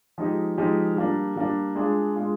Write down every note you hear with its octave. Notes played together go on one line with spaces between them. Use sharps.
F3 G#3 D#4 G4
F3 G#3 D#4 G4
G3 A#3 D4
G3 A#3 D4
G#3 D4 F4 G#4
G#3 D4 F4 G#4